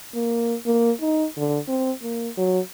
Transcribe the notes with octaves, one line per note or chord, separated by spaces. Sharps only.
A#3
A#3
D#4
D3
C4
A#3
F#3